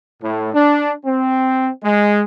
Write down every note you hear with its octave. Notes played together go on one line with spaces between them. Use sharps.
A2
D4
C4
G#3